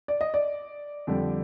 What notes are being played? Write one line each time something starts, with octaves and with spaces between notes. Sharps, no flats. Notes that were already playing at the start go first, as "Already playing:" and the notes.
D5
D#5
D5
F2 D3 G3